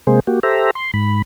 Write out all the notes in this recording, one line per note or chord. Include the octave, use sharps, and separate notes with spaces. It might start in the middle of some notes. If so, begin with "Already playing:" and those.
C3 G#3 A#3 G#4 C5
A#3 F#4 G4
G4 A4 C5 E5 A#5
C6
G#2 B5